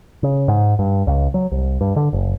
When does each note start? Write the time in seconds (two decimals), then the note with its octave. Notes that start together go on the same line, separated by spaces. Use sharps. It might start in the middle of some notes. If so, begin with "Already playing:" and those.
0.23 C#3
0.48 G#2
0.79 G2
1.07 C#2
1.34 F#3
1.52 C2
1.81 G2
1.96 D3
2.13 F#1